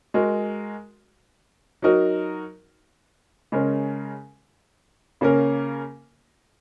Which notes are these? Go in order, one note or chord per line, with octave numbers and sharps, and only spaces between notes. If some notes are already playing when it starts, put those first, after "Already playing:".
G#3 F#4 A#4
F#3 D#4 F#4 A#4
C#3 G#3 C#4 A#4
C#3 A#3 C#4 A#4